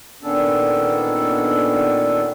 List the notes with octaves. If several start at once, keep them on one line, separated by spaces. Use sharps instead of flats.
A#2 D#3 B3 C#4 D4 A4